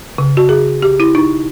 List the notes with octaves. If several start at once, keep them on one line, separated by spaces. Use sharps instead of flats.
C#3
F#4
G#4
G4
E4
D#4